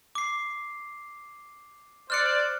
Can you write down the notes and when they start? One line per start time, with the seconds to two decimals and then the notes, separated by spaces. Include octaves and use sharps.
0.15 D6 C7
2.10 C5 D5 F6 F#6 C#7